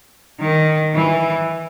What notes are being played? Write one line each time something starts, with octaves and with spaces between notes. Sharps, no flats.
D#3
E3